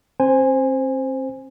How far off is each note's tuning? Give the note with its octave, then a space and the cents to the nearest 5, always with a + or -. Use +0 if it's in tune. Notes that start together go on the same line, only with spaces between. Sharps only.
C4 +40 C5 +0 G#5 -15